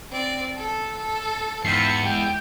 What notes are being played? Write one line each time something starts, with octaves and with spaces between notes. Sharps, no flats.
C4 D5
A4
A4
E2 G#2 C4 F4 E5 C7 C#7
G#3 G4 G5